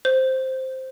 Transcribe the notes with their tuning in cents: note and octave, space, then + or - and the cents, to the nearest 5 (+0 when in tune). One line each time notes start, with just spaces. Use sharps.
C5 +0